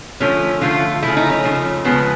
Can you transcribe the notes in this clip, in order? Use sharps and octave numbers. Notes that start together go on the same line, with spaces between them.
D3 F3 A3 C#4
D3 F3 A3 F4
C#3 F3 A3 E4
D#4
C#4
C#3 F3 A3
C#3 F3 G#3 B3